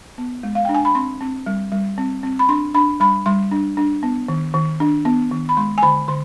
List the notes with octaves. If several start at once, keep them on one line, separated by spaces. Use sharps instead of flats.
B3
G#3
F5
D4 G5
G#5
B5
C4 C6
C4
G3
G3
C4
C4
B5
D4 C6
D4 B5
G3 B5
G3 C6
D4
D4
B3
D#3
D#3
D4
B3
D#3
B5
G#3 C6
G#5
D3 B5
D3 C6